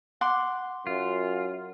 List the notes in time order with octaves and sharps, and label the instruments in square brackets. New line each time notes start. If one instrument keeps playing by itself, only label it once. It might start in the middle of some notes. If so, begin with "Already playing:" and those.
[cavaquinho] F#5 C6 D6
[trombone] F#2 [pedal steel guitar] F4